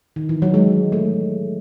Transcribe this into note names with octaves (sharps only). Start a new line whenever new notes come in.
D#3
E3
F#3
G#3
A3